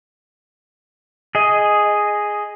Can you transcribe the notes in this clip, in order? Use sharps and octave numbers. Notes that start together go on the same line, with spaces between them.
G#4 D#5